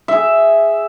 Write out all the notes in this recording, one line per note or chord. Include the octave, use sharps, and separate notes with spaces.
G#4 E5